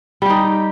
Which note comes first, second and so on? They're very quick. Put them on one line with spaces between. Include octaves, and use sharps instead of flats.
G3 G4 D#4